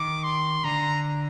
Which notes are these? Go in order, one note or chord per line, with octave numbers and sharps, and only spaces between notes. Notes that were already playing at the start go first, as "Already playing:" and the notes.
Already playing: D#3 D6
C6
D3 A#5